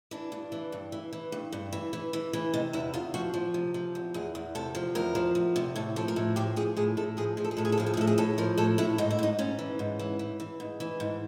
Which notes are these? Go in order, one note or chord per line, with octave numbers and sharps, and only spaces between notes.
E3 D4
G2
E3
G2
E3
E3
G2
G2
E3
E3
E3
E3
C3 D#4
E2 E4
E2 F4
F3 F#4
F3
C3
F3
E2
E2 G#4
E2
C3 A4
F3
E2 A#4
F3
E2
C3
A2 A4
F3 A4
A#4
A2 A4
F3 G4
F3 G#4
A2 G#4
A2 A4
F3 G#4
F3 G#4
A4
G#4
A2 A4
G#4
A4
F3 G#4
A4
G#4
A2 A4
G#4
A2 A4
F3 A#4
A2 A4
A2 E4
G#2 D#4
E4
G#2 D#4
G#2 C#4
E3
G#2
E3
E3
E3
G#2
E3
G#2